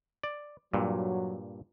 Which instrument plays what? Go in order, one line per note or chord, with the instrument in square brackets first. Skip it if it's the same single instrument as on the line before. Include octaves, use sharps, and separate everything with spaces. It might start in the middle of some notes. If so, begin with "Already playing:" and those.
[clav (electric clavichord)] D5
[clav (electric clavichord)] G2 A#2 [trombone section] F#3